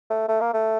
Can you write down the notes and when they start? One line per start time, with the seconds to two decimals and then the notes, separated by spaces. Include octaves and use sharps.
0.11 A3
0.28 A3
0.41 A#3
0.54 A3